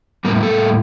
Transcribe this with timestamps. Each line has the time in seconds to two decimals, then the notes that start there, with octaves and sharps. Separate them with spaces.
0.25 A2 G3 A#3 A#4
0.43 A4